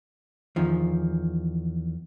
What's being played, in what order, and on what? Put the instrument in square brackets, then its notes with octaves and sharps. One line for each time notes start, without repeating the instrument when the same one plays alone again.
[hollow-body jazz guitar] E2 D#3 F3